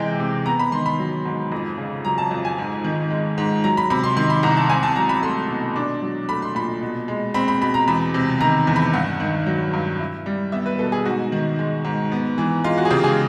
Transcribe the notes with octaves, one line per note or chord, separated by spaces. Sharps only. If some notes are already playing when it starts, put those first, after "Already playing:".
Already playing: C3 E3 G#3 G5
C3
B3 A#5
B5
D#3 C6
B5
F#3
G#2
F2
C#3
F#3 A#5
A5
F2
G#5
G#2
D#3
G#3
G#2
F#3 A#5
B5
C3 B5
C6
D#3 C6
B5
C2 A#5
A5
C4 G#5
A5
F#3 A#5
B5
A3 C6
B2
D4
F#3
A3 B5
C6
A#2 B5
B2
G#3
C4 B5
B5
B2 B5
A#5
E2 B5
C3
D#3 A#5
E2
B5
G2 F#5
D#3
F#3
G2
E4
G3
B3 E5
B4
B2 A4
G#4
G#2 F#4
D#3
G#3
G#2
B3
E3
G#3 F4
F#4
G#4
C#3 G4
G#4